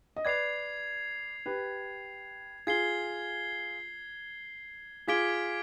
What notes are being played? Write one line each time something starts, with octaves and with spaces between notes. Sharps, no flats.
D#5
B4 D5 G#6 C7 F7
G4 B4
F4 G#4 G#6 C7 G7
F4 G#4 D6 G#6 B6 D7 G7